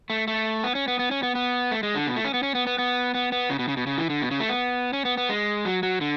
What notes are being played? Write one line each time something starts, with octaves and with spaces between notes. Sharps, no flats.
A3
A3
B3
C#4
B3
B3
C#4
B3
B3
A3
G#3
D3
B2
A3
C#4
B3
C#4
B3
B3
B3
B3
B3
C#3
B2
C#3
B2
C#3
E3
D3
B2
C#3
A3
B3
C#4
B3
B3
G#3
F#3
F#3
D3